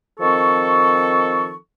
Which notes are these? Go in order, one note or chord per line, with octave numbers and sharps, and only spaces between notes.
D#3 F3 C4 A4 C#6